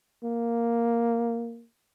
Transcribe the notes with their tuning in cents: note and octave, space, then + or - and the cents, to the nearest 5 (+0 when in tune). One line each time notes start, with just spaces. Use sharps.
A#3 +0